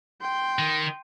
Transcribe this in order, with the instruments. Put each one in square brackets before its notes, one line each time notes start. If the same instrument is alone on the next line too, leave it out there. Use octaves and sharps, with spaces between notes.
[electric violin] G5 C6
[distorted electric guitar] D#3